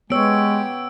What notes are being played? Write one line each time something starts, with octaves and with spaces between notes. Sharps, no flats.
G#3 B3 G4 C#5 E6 D7